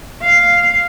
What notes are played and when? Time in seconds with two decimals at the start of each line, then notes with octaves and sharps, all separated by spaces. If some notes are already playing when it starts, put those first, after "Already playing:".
0.22 F5